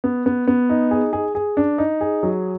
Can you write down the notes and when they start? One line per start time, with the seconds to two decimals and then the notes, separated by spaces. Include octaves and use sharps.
0.04 B3
0.26 B3
0.47 B3
0.70 D#4
0.91 G#4
1.13 G#4
1.35 G#4
1.57 D4
1.78 D#4
2.01 G#4
2.23 F#3